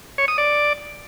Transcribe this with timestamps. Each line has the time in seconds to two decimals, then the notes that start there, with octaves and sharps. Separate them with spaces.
0.18 C#5
0.28 D#6
0.38 D5